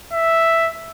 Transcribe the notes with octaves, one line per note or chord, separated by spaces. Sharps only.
E5